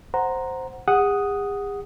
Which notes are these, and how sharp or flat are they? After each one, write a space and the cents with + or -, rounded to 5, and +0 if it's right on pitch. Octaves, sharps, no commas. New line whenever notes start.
C5 +0 F#5 +0 A#5 +0
G#4 -45 F#5 +0 D#6 +0